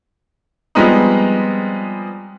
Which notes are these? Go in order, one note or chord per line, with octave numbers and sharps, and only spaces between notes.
F3 G3 G#3 B3 C4 D#4